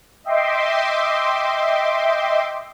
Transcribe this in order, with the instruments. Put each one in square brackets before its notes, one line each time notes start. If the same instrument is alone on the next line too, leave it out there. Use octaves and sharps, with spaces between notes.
[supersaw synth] D#5 E5 G5 C6 D6